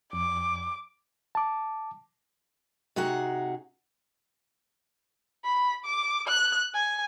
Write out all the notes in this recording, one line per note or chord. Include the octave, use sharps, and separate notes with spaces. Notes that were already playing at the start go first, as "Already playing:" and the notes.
F2 D6
A5 D6
C3 D#4 F#4 G#4 F#5
B5
D6
F#6
G#5